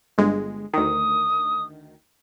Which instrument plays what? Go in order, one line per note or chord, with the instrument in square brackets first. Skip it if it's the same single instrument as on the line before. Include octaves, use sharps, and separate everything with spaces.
[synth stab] G1 G#3
[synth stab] D2 D#3 [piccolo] D#6